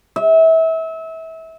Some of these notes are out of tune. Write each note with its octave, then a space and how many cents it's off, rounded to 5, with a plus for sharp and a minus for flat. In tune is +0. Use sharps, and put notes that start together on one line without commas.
E5 -30